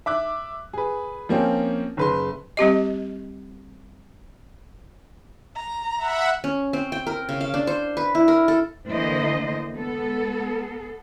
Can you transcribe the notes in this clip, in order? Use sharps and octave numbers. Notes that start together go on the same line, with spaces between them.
E5 D6 F#6
G#4 B4
F3 A#3 C4 C#4
F#1 B4 C6
G3 C4 G4 D#5
A#5
E5 F#5 B5
C#4
C4
G5
A#4
C#3
F5
D4
C5
B4
E4
A#4
A4
D3 E3 A#3 C5 D#5
G#3 B3 A4